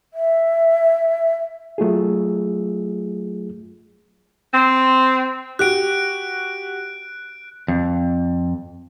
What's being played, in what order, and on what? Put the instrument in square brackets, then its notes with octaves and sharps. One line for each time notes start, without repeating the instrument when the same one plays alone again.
[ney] E5
[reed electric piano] F#3 A3 F4 G#4
[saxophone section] C4
[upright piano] F#4 G4 [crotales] F#6 D7
[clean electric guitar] F2